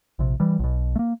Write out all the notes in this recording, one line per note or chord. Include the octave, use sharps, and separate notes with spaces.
A#1 C3
E3 G3
B1 B2
A3 A#3